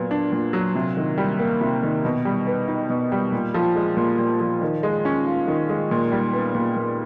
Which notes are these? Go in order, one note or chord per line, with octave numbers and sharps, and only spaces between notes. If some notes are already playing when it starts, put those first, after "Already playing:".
Already playing: A#2 F#3 B3
D4
A#2
F#3
C3
D#3
G3
A#3
C3
D#3
B2
G3
B3
D#4
B2
G3
A#2
F3
G#3
A#2
A#2
F3
D#3
G#3
C#4
F4
D#3
G#3
A#2
G3
B3
A#2
A#2